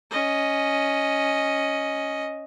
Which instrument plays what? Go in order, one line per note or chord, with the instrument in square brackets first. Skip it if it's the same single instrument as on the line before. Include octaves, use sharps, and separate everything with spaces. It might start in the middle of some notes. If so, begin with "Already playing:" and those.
[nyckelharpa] C#4 D#5